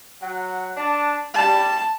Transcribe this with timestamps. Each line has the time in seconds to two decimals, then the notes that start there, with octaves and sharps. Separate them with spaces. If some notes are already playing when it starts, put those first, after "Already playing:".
0.20 F#3 F#5
0.76 D4 A5
1.34 G3 A5